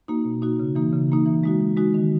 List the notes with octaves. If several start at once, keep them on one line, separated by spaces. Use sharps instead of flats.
A#3 D#4 F#4
B2
A#3 D#4 F#4
C#3
E3 A#3 D#4
C#3
E3 A#3 D#4
E3
G#3 D#4 F#4
E3
G#3 D#4 F#4
D#3